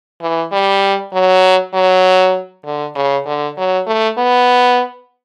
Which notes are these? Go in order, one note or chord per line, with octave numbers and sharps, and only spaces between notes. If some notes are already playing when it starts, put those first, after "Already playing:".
E3
G3
F#3
F#3
D3
C#3
D3
F#3
A3
B3